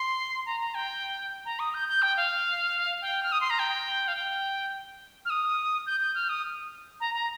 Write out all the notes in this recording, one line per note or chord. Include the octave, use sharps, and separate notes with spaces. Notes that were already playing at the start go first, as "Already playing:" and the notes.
Already playing: C6
A#5
A#5
G5
A#5
D#6
G6
G6
G5
F5
G5
F6
D#6
C6
A#5
G5
F5
G5
F6
D#6
G6
G6
F6
D#6
A#5
A#5